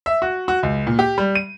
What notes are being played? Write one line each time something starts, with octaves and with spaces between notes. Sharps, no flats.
E5
F#4
F#4
C#2
A#2
G4
G3
D#7